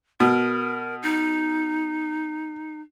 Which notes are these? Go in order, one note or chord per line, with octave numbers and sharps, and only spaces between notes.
B2 A#4
D#4